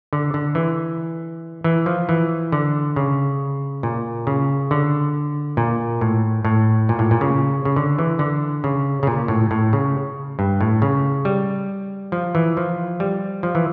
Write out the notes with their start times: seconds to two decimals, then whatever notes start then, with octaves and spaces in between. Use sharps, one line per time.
0.13 D3
0.34 D3
0.55 E3
1.64 E3
1.86 F3
2.09 E3
2.52 D3
2.96 C#3
3.83 A#2
4.27 C#3
4.71 D3
5.57 A#2
6.01 A2
6.45 A2
6.89 A#2
6.99 A2
7.11 A#2
7.21 C#3
7.65 C#3
7.76 D3
7.99 E3
8.19 D3
8.64 C#3
9.03 C#3
9.07 A#2
9.28 A2
9.51 A2
9.73 C#3
10.39 G2
10.61 A2
10.82 C#3
11.25 G3
12.12 F3
12.35 E3
12.57 F3
13.00 G3
13.43 F3
13.55 E3